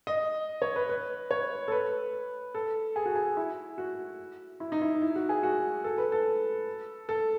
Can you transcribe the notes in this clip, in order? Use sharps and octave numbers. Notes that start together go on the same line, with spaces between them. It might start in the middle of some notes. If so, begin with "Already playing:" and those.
D#5
C#5
B4
B4
C#5
A4
B4
A4
G#4
F#4
G#4
E4
F#4
E4
D#4
E4
E4
F#4
G#4
F#4
A4
B4
A4
A4